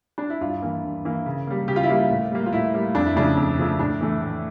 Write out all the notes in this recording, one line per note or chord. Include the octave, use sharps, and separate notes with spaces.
D4
E4
G2 F4
E3 A#3
G2
E3 A#3
C#3
G3 A#3
C#3 G4
F4
E4
G3 A#3 F4
A2
G3 A#3
F4
A2 E4
G3 A#3
F2 D4
E4
C#3 F3 A3 D4
F2
C#3 F3 A3
A2 D4
E3 A3
A2